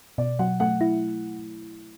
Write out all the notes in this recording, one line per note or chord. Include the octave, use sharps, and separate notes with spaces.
B2 D5
F#3 F#5
A3 F#5
E4